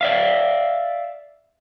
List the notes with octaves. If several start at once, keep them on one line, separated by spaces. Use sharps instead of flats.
D5 E5 F5